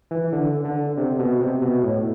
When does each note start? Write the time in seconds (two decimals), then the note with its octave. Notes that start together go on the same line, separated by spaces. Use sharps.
0.11 E3
0.32 D3
0.65 D3
0.97 C3
1.19 B2
1.40 C3
1.62 B2
1.83 A2